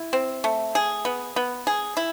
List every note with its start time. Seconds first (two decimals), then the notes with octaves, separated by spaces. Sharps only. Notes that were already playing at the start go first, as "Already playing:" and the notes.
Already playing: E4
0.13 C4
0.44 A3
0.75 G#4
1.05 B3
1.36 B3
1.67 G#4
1.97 E4